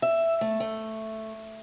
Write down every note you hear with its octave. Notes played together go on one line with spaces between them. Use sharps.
E5
A3
A3